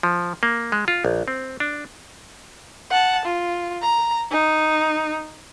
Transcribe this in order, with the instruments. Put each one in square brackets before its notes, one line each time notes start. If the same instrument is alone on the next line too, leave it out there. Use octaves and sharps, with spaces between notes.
[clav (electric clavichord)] F3
A#3
G#3
F4
A#1
C4
D4
[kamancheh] F#5 A5
F4
A#5
D#4